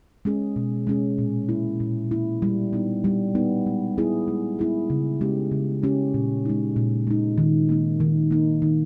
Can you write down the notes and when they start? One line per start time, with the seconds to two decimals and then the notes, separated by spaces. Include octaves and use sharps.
0.25 G#3 C#4 G#4
0.56 B2
0.87 G#3 C#4 G#4
1.18 A#2
1.49 A#3 E4
1.80 A#2
2.11 A#3 E4
2.42 G3
2.73 B3 D#4
3.04 G3
3.35 B3 D#4
3.66 G#3
3.98 B3 E4 G#4
4.28 G#3
4.59 B3 E4 G#4
4.90 C#3
5.21 G#3 C#4 G4
5.51 C#3
5.83 G#3 C#4 G4
6.14 A#2
6.45 G#3 D#4
6.76 A#2
7.07 G#3 D#4
7.38 D#3
7.69 A#3 D#4
8.00 D#3
8.31 A#3 D#4
8.62 D#3